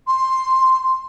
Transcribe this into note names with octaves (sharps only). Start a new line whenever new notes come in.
C6